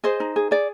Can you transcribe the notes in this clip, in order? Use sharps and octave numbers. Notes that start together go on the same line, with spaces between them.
G#4 C5 D#5
D#4
G#4
G#4 D5